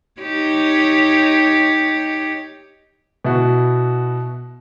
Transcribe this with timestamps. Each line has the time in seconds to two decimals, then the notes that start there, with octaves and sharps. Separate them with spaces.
0.22 D#4 G4 C#5
3.25 B2 E4 F#4